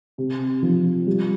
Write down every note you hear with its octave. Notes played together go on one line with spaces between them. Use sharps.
C3
F3
G3